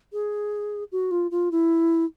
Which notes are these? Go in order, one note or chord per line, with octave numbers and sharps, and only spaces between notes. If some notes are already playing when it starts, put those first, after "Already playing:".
G#4
F#4
F4
F4
E4